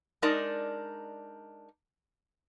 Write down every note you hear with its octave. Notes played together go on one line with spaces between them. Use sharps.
G#3 D4 D#4 A#4 D5